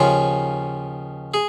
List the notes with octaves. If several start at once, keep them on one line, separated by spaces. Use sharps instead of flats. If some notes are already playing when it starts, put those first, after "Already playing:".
Already playing: D#2 C#3 F3 C#4 F4
G#4